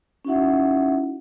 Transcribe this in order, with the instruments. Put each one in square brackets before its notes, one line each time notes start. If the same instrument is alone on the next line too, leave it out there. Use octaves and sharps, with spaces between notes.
[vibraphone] C#4 D#4 E4 F#4 E5 F#5